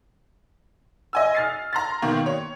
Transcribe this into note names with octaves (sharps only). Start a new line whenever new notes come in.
D#5 G#5 E6
F6 A6 C7
A#5 C6 A6
B2 D#3 A#3
C#5